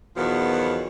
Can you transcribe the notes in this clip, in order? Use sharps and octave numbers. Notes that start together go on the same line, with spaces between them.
E2 B2 D#3 F3 F#3